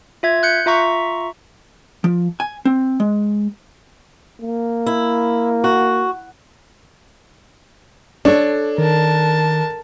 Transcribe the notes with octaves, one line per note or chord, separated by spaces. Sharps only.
F4 E5 G#6
F#6 G6 C#7
F4 E5 A#5 C#6 B6
F3
G#5
C4
G#3
A#3
E4
F#4
D4 A4 C#5
D#3 A#4 A5